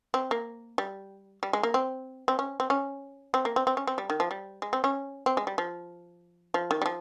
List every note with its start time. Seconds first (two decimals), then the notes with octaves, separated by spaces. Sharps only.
0.14 C4
0.31 A#3
0.78 G3
1.43 G3
1.53 G#3
1.63 A#3
1.74 C4
2.28 C4
2.39 C#4
2.60 C4
2.70 C#4
3.34 C4
3.45 A#3
3.56 C4
3.67 C4
3.77 C#4
3.87 C4
3.98 G3
4.10 D#3
4.20 F3
4.31 G3
4.62 G#3
4.73 C4
4.84 C#4
5.26 C4
5.37 G#3
5.47 G3
5.58 F3
6.54 F3
6.71 D#3
6.82 G3
6.86 F3